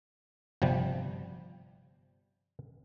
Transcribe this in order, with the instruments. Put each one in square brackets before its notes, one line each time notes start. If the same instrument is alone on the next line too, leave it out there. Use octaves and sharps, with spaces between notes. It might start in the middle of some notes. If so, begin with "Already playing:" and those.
[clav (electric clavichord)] G1 C3 F3 G3